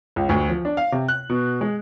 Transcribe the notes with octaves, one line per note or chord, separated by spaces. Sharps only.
C#2
D2
F3
D4
F5
C3
F#6
B2
G#3